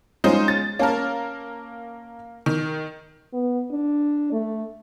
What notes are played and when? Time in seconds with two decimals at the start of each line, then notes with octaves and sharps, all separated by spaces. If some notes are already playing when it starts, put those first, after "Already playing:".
0.24 G#3 C#4 D#4 F4 C5
0.48 A6
0.79 A#3 C#4 A#4 A5
2.46 D#3
3.33 B3
3.71 D4
4.32 A3